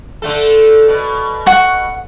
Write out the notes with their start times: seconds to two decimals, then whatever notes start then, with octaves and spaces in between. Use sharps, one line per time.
0.22 D3 A3 A4
0.88 B2
1.46 F#5 C#6